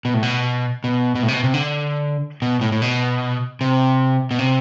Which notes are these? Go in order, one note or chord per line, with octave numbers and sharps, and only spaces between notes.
B2
A2
B2
B2
B2
A2
C3
B2
C3
D3
B2
A2
A2
B2
C3
B2
C3